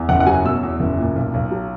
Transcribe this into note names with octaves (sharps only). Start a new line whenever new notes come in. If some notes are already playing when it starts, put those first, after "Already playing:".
Already playing: E2
F#1 F#5
F#5
F#3 G#5
B2 E6
E2
F#1
A#2
B1
B1
F#3